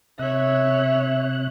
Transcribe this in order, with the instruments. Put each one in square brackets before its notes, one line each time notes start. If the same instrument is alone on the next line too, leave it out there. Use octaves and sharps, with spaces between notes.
[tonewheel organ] C3 F#6 [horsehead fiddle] C#5 E5